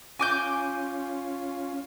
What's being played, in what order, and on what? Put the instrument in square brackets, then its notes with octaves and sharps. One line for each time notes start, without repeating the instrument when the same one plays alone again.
[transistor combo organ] C#4 F4 [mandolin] G#5 D6 G6